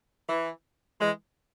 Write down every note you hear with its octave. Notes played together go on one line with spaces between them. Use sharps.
E3
E3 G#3